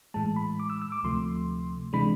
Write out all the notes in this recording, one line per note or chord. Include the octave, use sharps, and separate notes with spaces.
A2 E3 G#3 A5
B5
D6
E6
E6
D6
D2 C3 F3 A3 C6
C3 E3 G#3 D4 B5